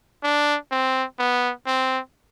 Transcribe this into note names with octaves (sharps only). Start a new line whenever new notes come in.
D4
C4
B3
C4